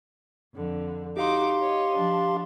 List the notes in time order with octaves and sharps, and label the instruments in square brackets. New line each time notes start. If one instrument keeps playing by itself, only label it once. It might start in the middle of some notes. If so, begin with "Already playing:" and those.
[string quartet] F2 D3
[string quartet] D#4 F#4 D6 [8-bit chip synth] G4 F5 C6
[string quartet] C#5 D#5
F3 D4